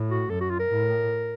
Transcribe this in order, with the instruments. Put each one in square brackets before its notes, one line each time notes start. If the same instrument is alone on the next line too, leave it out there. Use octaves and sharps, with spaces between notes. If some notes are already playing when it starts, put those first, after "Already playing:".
Already playing: [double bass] A2
[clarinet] F#4
[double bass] F#2 [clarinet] A4
[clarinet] F#4
F4
A#4
[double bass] A2